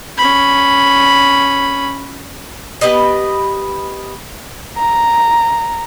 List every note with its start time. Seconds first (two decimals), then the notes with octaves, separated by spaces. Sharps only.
0.18 C#4 B5
2.81 B3 G4 B4 D#5
4.78 A#5